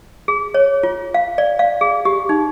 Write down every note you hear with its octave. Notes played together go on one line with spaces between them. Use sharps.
G#4
C#5
F4
F5
D5
F5
G#4
G4
D#4